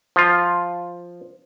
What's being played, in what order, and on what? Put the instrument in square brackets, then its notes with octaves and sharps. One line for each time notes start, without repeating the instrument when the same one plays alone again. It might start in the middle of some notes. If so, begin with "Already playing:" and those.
[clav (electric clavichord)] F3 F4